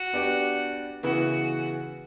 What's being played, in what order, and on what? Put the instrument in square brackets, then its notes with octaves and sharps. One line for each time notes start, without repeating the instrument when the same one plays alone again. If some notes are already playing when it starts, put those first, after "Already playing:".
Already playing: [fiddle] F#4
[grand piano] B3 D4 G4 D5
[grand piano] C#3 E3 B3 E4 B4 [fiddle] F#4